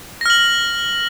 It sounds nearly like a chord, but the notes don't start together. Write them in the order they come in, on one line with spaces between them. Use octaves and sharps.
A#6 F6 F#7